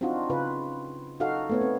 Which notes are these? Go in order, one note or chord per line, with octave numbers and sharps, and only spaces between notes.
C4 D4 D#4 F4 F#4
C#3 F4 B4
D#4 F#4 A4 F5
A3 B3 C#5
C4